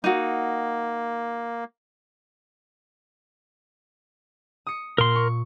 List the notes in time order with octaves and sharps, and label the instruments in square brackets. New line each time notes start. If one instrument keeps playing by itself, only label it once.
[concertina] A#3 [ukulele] D#4 F#4
[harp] D#6 C#7
[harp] A#2 [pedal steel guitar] A#4 C6
[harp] C#6